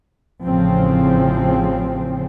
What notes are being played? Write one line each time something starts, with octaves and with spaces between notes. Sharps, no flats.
A1 C#3 F3 C4